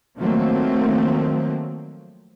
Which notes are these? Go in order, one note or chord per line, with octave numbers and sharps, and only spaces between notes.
D#3 F3 F#3 A3 A#3 C4